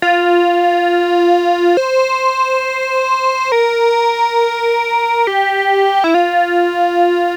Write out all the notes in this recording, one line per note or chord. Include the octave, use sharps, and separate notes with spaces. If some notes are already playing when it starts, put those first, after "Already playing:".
F4
C5
A#4
G4
E4
F4